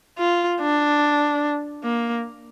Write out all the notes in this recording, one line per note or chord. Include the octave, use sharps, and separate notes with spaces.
F4
D4
A#3